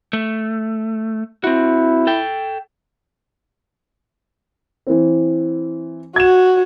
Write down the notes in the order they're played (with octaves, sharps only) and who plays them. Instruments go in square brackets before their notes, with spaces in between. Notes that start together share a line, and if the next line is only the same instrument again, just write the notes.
[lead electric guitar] A3
[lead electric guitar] C4 F#4 [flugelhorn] E4
[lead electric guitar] A4 G5
[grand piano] E3 C4
[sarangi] F#4 [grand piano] G#6 E7